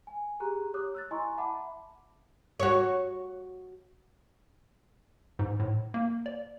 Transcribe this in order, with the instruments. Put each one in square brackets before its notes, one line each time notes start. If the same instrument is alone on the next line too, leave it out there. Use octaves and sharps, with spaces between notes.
[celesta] G#5
G4 G#4 A#5 F#6
G4 C#5 D6 D#6 F#6
E6 F#6 A6
E4 D#5 G#5 A#5 C6 C#6
E5 F#5 A5 B5 D6
[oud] F#4 C#5
[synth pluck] G#2
A2
A#3
D5